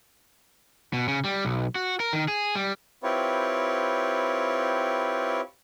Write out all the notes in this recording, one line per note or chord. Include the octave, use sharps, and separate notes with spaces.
B2
C#3
G3
B1
F#4
A#4
D#3
G#4
G3
C4 E4 F4 G4 B4 C#5